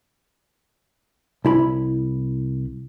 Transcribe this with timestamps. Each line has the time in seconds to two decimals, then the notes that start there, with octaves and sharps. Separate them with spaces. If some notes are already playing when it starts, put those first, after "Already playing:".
1.45 C2 E4 B5